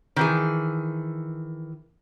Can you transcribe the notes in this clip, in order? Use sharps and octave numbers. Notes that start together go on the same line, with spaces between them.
D#3 E3 G#4